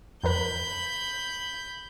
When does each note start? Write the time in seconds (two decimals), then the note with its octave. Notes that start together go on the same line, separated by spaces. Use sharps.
0.23 F2 A#4 B4 B5 G6